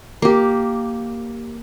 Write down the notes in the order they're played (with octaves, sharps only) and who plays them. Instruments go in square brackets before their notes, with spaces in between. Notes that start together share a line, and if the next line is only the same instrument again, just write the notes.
[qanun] A#3 G4